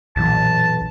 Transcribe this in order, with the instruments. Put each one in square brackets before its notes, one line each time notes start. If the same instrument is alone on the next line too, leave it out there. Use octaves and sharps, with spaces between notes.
[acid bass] B1 [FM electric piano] F#2 A#2 E3 [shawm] A5